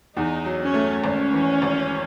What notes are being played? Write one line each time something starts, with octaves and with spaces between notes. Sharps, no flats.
E2 D#4
F#3
C#4
A3
G#1 C#4
E3
G#1